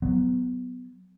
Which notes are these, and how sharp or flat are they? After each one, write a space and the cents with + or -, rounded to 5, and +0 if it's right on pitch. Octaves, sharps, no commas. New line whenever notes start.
F#3 +0 B3 +15